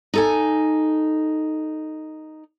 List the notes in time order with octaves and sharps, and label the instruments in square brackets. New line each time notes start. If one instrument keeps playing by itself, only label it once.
[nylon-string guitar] D#4 A4 G#5